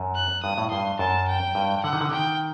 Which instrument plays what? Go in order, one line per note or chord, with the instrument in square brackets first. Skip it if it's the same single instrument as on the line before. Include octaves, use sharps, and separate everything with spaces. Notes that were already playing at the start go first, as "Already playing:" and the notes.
Already playing: [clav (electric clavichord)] F#2
[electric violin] F#6
[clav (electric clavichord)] G2 [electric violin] D#6
[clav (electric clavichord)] A2
[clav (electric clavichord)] G2 [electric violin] C6
[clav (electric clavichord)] F#2 [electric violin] A5
[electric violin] G5
[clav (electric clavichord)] G2
[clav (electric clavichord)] D3 [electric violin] F#5
[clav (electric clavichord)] D#3
D3
[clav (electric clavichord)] D#3 [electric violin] G5